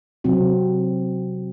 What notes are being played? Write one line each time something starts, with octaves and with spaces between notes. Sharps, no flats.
C3 F#3 C4 F#4